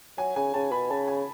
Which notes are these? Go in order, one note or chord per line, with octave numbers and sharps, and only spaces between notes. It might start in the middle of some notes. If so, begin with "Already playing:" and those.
F#3 G#5
C#3 G#5
C#3 A5
B2 B5
C#3 A5
G#5